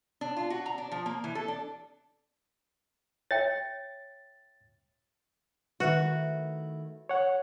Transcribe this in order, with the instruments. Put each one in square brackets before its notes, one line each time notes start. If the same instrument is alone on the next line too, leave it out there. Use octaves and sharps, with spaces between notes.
[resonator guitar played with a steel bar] D4
F4
F#4
A#5
D4
F3
A#3
E3
A4
D4
[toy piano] C#5 E5 G5 [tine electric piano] A6
[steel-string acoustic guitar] D#3 A3 E4 [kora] F#4 [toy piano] B4 E5
[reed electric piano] C#5 F#5